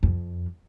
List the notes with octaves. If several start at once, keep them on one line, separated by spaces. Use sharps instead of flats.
F2